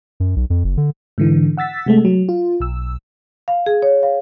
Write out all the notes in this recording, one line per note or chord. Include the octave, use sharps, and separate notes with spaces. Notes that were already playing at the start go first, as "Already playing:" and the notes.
F#2
B1
F2
F#1
D3
G#2 D3 E3
F#5 E6 A6 B6
C3 G#3 A3
F#3
F4
B1 E6
F5
G#4
C#5
F5